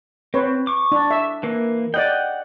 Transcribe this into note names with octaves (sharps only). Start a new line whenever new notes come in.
C4 B4 C#5
C#6 D6
D4
E5
E3 A#3
D5 D#5 F#5 G5